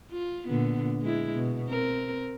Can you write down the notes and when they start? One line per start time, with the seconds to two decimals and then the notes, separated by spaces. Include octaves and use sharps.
0.11 F4
0.48 A#2 D3 B3
1.01 G#3 E4
1.35 B2
1.68 C4 A#4